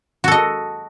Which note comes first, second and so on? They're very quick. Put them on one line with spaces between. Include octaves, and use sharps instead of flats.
F#4 A4 D#5